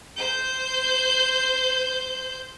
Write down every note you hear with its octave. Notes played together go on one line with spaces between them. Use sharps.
C5 G6